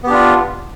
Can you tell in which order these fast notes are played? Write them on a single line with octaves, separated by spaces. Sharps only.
B3 G4 D4 F4